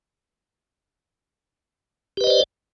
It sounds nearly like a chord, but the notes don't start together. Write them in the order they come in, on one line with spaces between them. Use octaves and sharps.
G4 B4 D#5 C5 D5